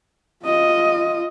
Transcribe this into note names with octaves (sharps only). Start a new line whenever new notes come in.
F4 D#5